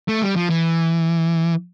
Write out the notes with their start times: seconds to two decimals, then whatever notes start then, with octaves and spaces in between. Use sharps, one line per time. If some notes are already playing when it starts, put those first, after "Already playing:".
0.08 A3
0.22 G3
0.36 F3
0.50 E3